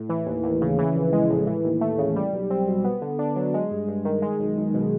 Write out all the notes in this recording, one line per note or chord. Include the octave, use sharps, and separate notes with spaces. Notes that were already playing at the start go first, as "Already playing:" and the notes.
Already playing: A2
E3
D#2
D#2
C#3
E3
A#1
G#3
A2
E3
D#2
A3
C#3
G3
B1
C4
B2
B3
D3
D4
F#3
G#3
G2
G2
D#3
G#3
B1
B1
B2